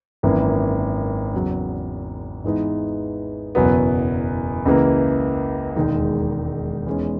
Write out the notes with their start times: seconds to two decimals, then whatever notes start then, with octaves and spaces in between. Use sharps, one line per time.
0.23 G#1 F#2 E3 A#3
1.34 E2 C#3 F#3
2.44 G#2 E3 G#3 B3 D#4
3.55 F#1 E2 B2 F#3 B3
4.65 C#2 C#3 E3 A#3
5.76 E1 D#2 D#3 G#3 D#4
6.86 E2 D#3 G#3 C#4